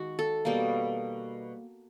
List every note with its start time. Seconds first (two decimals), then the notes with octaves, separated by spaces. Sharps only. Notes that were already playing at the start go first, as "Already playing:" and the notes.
Already playing: D#3 G#3 F#4
0.19 A4
0.45 B2 G3 A#3